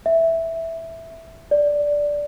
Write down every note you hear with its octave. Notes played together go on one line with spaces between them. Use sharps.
E5
D5